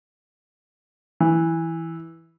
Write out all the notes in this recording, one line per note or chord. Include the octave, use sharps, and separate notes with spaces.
E3